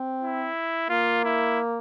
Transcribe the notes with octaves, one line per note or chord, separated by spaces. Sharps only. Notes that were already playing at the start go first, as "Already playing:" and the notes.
Already playing: C4
E4
A#3 F4
E4